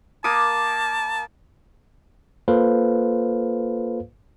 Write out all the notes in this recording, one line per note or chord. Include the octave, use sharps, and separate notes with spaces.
A#3 A5 D6 D#6
A#3 F4 A4 B4 C5 F5